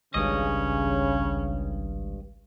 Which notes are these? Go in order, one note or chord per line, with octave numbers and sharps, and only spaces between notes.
G#1 C#2 G2 C#3 C#4 D#5